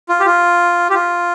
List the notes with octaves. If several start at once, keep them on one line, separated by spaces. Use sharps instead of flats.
F4
G4
F4
G4
F4